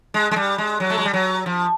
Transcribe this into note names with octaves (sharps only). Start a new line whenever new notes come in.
G#3
G#3
G3
G#3
F#3
A3
G#3
G3
F#3
F3